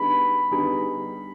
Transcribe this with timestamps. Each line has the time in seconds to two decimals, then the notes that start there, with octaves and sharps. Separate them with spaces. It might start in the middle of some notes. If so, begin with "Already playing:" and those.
Already playing: D3 G3 B3 D#4 G#4 B5
0.51 D3 G3 B3 D#4 G#4